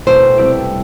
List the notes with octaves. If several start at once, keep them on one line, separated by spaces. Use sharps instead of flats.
B2 A3 C4 E4 C5
C3 G3 C4 E4 G4